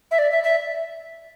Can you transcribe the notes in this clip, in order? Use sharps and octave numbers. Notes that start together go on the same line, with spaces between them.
E5
D5
E5
E5